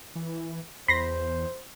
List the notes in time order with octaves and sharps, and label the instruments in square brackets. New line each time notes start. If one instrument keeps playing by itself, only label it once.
[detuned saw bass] E3
[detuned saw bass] E2 [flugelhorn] C5 [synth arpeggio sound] B5 C6 A#6